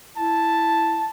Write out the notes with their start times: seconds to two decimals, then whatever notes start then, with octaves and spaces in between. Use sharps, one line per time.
0.17 E4 A5